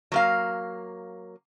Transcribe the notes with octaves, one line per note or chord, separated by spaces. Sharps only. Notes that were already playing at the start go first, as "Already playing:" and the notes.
F#3 A#3 F5